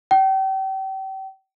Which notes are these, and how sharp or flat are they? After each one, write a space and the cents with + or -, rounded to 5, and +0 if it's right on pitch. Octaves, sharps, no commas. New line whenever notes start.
G5 -35